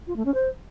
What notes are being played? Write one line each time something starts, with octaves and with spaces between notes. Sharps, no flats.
F4
A3
C#4
C5